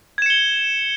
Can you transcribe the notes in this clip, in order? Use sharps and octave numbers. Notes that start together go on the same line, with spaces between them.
G#6 C#7 E7 G7